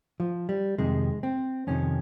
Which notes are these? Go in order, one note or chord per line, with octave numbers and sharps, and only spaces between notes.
F3
G3
F2 C3 D#3 G#3
C4
F2 C3 D#3 C#4